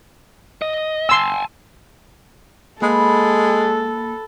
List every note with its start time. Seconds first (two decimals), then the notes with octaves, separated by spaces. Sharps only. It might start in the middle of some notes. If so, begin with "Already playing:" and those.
0.62 D#5
1.09 G#5 A5 C6 E6
2.82 G#3 A#3 A4 B4